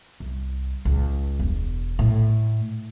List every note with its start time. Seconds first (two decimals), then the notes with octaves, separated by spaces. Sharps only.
0.20 C2
0.85 C#2
1.40 E1
1.99 A2